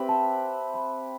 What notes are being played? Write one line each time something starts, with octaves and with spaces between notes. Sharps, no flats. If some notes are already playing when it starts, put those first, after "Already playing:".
Already playing: C4 G4 B4 E5 G5
A5
B5